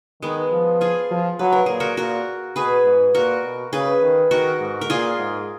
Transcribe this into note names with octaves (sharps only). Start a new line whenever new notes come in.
D#3 G#3 B3
F3
F4 G#4
F3
F#3 B4
A#4
A#2 G#4
F#4 A#4
A#2 F#4 A#4
B2 G#4 B4
G#2
A#2 F#4 A#4
B2
C#3 G#4 B4
D#3
D#3 F#4 A#4
G#2
A#4
A#2 F4 G#4
G#2